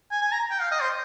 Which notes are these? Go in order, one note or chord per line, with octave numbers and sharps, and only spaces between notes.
G#5
G#5
A#5
G5
F5
D#5
C5